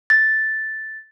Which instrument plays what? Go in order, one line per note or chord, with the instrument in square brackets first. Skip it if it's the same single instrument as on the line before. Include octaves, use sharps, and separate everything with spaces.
[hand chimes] A6